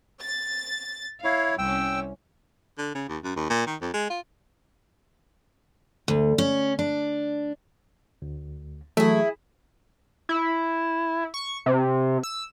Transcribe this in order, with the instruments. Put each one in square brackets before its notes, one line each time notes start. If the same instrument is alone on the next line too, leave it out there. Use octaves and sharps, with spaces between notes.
[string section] A6
[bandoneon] E4 C#5 [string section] F5
[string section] C2 C#4 [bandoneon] G5 E6
[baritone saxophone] D3
C#3
D#2
F#2
D#2
A#2
D#3
F2
G#3
F4
[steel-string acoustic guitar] D2
C#4
D4
[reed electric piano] D2
[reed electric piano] E3 F#3 A3 [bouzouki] E4 G#4
[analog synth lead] E4
C#6
C3
E6